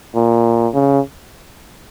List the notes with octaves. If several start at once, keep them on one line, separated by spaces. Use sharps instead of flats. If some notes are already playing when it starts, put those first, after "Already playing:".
A#2
C#3